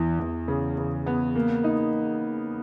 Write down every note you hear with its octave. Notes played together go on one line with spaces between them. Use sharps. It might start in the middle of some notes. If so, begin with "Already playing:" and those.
Already playing: E2 E3
E2
C#3
C#3
B3
A#3
D#4